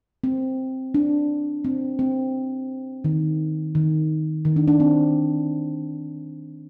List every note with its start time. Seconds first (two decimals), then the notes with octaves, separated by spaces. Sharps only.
0.24 C4
0.94 D4
1.65 C4
1.99 C4
3.04 D#3
3.75 D#3
4.45 D#3
4.56 D4
4.68 D4
4.80 C4